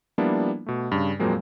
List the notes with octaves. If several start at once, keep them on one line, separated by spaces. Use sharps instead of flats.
F3 G3 A#3 B3 D4 E4
B2 A3
G2 C#3
F2 A#2 F#3 G#3 A#3 C4